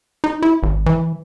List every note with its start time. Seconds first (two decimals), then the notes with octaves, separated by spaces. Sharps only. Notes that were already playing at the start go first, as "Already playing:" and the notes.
0.24 D#4
0.42 E4
0.63 G#1
0.86 E3